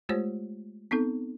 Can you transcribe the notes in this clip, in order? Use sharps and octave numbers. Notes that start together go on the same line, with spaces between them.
G#3 A3 F4 G4 C5 C#5
B3 C4 D#4 A4